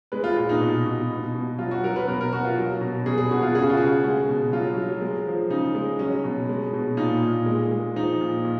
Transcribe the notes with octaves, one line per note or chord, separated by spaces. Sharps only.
G#3 B4
F4
A#2 F4
D#4
B2
B2
B2
B2
F#3 F4
F#4
F#3 A#4
B4
B2 A#4
A#4
B2 F#4
F4
F#3
B2
B2 G#4
G#4
B2 F#4
F4
C#3 G#4
F#4
F4
C#3 F#4
G#3
B2
F#3 F4
F#3
G#3
F3
C#3 D#4
G#3
F#3 C#4
B2
G#3
B2
A#2 D#4
A#2
G#3
G#3
F3 D#4
A#2
A#2